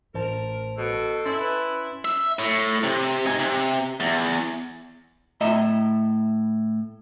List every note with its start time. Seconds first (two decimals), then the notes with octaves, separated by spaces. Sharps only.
0.15 A1 A#4 C5 A5
0.77 B2 A4
1.26 C#4 E4 C6 A6
1.40 B4
2.05 E5
2.39 A2
2.83 C3
3.27 D#4 G#5
3.39 C3
4.00 E2
5.41 A2 D#5 E5 A#5